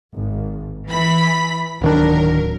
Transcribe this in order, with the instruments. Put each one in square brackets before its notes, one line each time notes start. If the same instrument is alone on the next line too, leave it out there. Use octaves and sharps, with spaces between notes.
[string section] G#1
E3 B5 B6
[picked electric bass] D1 D#3 D4 [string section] F#3 A#4